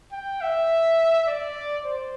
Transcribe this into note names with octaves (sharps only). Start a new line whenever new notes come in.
G5
E5
D5
C5